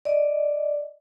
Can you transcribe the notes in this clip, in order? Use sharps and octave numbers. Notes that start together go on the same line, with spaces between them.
D5 D#5